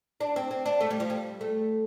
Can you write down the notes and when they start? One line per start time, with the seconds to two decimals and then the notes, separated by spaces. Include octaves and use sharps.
0.20 D4
0.36 C4
0.51 C4
0.66 D4
0.81 A3
0.90 G3
1.00 F3
1.10 G3
1.41 A3